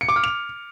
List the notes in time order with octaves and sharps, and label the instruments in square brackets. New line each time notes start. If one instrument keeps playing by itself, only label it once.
[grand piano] C#7
D6
F6
F7